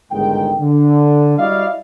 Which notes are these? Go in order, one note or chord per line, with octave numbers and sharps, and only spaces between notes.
G1 C2 G#2 D#3 G#3 G5
D3
G3 E4 F#4 D5 D#5 F5